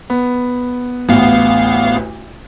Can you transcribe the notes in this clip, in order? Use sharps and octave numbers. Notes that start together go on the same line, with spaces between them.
B3
A1 D2 B3 F5